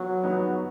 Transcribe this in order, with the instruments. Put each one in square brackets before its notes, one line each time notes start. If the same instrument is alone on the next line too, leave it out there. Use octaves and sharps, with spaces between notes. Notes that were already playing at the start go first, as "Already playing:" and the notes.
Already playing: [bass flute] F#3 [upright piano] B3
[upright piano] B3 D#4